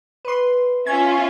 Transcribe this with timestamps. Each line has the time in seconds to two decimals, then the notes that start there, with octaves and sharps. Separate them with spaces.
0.25 B4 C6
0.86 C#4 F4 E5 G#6